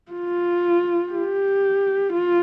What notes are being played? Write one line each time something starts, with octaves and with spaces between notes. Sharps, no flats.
F4
G4
F4